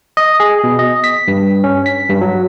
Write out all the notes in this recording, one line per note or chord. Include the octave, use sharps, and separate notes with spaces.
D#5
G#4
B2
D#5
B6
G2
C#4
B6
G2
F#3